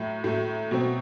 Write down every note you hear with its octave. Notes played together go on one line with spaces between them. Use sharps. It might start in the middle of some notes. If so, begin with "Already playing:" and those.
Already playing: A2 F#3 A3
A2 F#3 A3
B2 F#3 C4